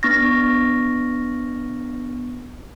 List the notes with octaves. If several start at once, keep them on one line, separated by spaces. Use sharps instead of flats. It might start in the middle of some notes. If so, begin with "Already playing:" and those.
B3 D4 C#6 F6 A6 A#6